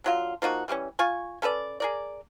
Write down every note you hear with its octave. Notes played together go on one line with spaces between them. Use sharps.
D3 F#3 F4
F3 A#3 D#4 F#4
E3 G3 C4 C#4
F4 G#5 C#6
C#4 A4 B4 D5
G#4 A#4 D5